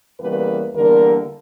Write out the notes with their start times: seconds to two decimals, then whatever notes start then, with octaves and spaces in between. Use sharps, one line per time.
0.20 E2 C#3 G3 A#3 B4
0.75 E2 D3 G3 A#3 A#4